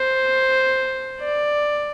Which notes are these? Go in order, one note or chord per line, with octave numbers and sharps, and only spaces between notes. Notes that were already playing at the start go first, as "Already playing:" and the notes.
Already playing: C5
D5